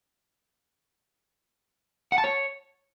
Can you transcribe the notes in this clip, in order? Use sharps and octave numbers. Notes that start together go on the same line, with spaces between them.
F#5
A5
C#5